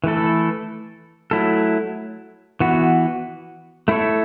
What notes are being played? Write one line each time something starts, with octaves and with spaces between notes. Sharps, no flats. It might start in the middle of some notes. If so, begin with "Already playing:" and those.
E3 A3 E4 A4
F#3 A3 E4 A4
E3 B3 F#4
A3 E4 A4 C#5